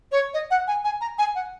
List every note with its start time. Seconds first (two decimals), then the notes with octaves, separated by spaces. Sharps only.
0.12 C#5
0.34 D#5
0.51 F#5
0.67 G#5
0.84 G#5
1.01 A#5
1.18 G#5
1.35 F#5